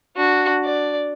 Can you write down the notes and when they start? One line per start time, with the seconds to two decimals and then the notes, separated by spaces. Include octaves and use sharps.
0.16 D4 F#4
0.65 D5